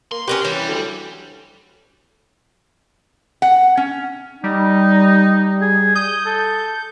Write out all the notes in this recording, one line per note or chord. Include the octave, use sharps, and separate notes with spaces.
A#3 C6
C#4 G4 A#4 B4
E3 G3 C#4
D2
F#5
C#4
G3 D#4
G#4
D#6 G6
A4